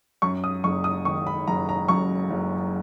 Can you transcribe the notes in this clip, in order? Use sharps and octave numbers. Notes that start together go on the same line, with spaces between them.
F#2 C#6
D#6
F#1 C#6
D#6
D#3 C#6
B5
F#1 A#5
A#5
F#2 C#6
F#1